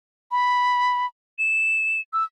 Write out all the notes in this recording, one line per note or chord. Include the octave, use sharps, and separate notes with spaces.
B5
E7
E6